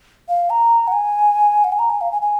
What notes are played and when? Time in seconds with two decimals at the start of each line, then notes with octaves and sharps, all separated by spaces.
0.29 F5
0.50 A#5
0.88 F#5
0.92 G#5
1.64 F#5
1.72 G#5
1.79 A#5
1.90 G#5
2.01 F5
2.12 G#5
2.22 G#5